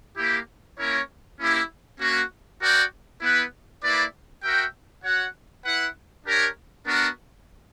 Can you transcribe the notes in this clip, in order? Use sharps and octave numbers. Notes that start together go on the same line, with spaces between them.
A#3 E4 G4
A#3 C#4 E4 A#4 C#5
A#3 C#4 E4 G4
A#3 C#4 F#4
F#4 A#4 D5 G5
B3 E4 B4
A#3 E4 B4 D5
F#4 A#4 E5 G5
F#4 C#5 F#5
E4 B4 F#5
D4 G4 A#4 C#5
B3 D4 F#4 A#4